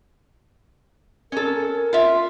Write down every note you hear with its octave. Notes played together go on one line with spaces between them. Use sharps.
C#4 A4 A#4
F4 E5